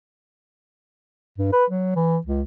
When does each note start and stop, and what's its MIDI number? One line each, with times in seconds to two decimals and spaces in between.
1.38 1.50 43
1.53 1.65 71
1.70 1.92 54
1.96 2.18 52
2.27 2.42 37